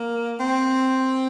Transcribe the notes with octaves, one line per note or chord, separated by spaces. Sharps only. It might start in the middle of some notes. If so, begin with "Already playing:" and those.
Already playing: A#3
C4